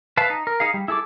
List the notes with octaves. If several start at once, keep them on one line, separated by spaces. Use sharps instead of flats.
B4 E5 F5 A5
D#4
A#4
D#4 G#4 F5
G3
E4 G#4 A4 D6